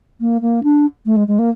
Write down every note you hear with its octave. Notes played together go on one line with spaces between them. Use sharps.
A#3
A#3
D4
A3
G#3
G#3
A#3